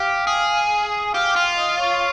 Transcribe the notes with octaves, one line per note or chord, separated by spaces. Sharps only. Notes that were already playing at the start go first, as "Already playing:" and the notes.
Already playing: G4 F5
G#4
G4 F5
F4
D#5
C#5